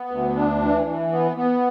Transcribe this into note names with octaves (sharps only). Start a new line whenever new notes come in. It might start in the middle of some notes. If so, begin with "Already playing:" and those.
Already playing: B3
D2
D4
E3
E3
B3
B3